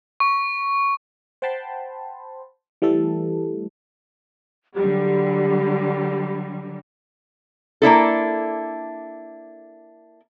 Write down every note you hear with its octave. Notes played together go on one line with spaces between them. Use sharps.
C#6
C5 F#5 G5 A5 B5 C6
E3 G3 A3 A4
D3 F#3 G3 G4
A#3 D4 E4 A4